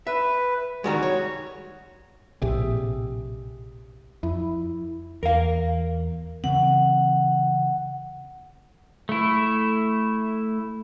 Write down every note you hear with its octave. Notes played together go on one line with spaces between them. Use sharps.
B4 E5
D#3 G3 G#3 F#4
C#5
A#1 A2 C3 G4 G#4 E5
F2 E4
E2 A#4 F5
C#3 E3 C4 F#5
A3 E4